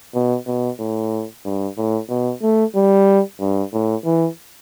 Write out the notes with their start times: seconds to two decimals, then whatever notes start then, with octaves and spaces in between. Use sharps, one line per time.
0.14 B2
0.47 B2
0.79 A2
1.45 G2
1.77 A2
2.09 B2
2.42 A3
2.76 G3
3.40 G2
3.73 A2
4.05 E3